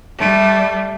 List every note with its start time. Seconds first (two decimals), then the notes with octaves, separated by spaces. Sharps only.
0.20 G3 A3